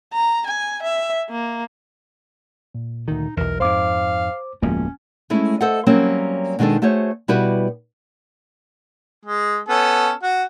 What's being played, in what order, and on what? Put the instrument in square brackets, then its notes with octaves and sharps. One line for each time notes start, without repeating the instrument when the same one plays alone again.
[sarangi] A#5
G#5
E5
A#3
[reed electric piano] A#2
[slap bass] D2 D#3 [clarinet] D#4
[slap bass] B1 E2 [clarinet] A#4
[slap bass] F2 G#2 [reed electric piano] C5 D6 [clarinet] F5
[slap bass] D1 F2 A#3 [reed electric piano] F3 G#3 B3 [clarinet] C#4
[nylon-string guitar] G#3 A3 C#4 E4
A4 C5 D#5 E5 F#5
F#3 G3 A#3 C4 C#4
B2 D#3 G#3 D4 A4
A3 F#4 G#4 C5 C#5
B2 G3 E4 F#4 G4 B4
[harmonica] G#3
B3 C#4 A4
F#4